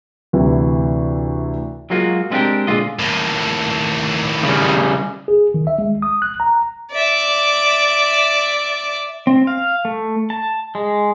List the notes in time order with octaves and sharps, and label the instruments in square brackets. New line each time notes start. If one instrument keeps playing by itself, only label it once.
[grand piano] D2 C3 E3
[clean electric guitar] F#3 G#3 A#3 F4 F#4
G#3 B3 C4 D4 G4 A#4
A#2 D3 G#3 F4 D#5
[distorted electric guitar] D#2 A2
[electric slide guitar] C#3 G3
[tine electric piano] G#4
D#3
E5
G#3
D#6
F#6
A#5
[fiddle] D5 E5
[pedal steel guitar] C4
F5
A3
A5
G#3